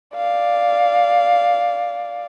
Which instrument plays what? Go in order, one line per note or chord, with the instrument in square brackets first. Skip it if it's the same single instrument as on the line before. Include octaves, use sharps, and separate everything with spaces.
[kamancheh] D5 F5